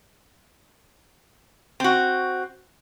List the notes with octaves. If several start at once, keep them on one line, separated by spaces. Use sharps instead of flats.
C4 F#4